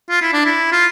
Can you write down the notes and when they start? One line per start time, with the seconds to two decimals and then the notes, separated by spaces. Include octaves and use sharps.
0.10 F4
0.22 E4
0.33 D4
0.45 E4
0.72 F4